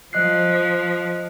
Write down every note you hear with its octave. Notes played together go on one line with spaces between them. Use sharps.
F3 D#5 F#6 C7